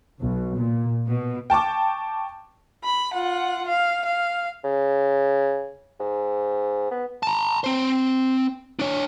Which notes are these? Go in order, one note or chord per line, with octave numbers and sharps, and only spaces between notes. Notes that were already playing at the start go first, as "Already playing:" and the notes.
B1
A#2
B2
G5 A5 C#6 D6
B5
F4 F#5
F5
F5
C#3
G#2
B3
A5 A#5
C4 C5
D4 C#5